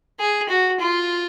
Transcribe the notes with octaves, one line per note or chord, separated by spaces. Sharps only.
G#4
F#4
F4